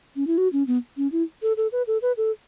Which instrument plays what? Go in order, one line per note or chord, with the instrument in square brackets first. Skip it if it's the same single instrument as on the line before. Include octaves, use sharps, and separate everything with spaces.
[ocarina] C#4
E4
F#4
C#4
B3
C#4
E4
A4
A4
B4
A4
B4
A4